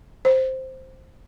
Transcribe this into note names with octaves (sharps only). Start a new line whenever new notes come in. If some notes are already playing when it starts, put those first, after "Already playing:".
C5